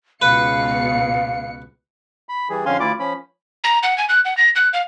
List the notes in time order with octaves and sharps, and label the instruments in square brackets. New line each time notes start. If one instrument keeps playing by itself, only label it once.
[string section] C#2 B2 C#7 [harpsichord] B4 [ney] F5
[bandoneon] B5
E3 G3 G#4
F2 D3 C#4 F5 G#5 C6
D2 E4 F4 D5 D6
F3 C#4 B5
[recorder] A#5
F#5
G#5
F#6
F#5
A#6
F#6
F5